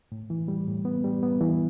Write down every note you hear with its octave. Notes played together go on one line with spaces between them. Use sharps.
A2
E3
G3
A2
B3
G3
B3
E3